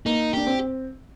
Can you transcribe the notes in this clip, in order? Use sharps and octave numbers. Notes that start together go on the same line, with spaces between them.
A#3 D#4
D4 G4
C4